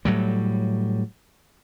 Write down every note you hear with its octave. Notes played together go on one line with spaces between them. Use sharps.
A2 F#3 G3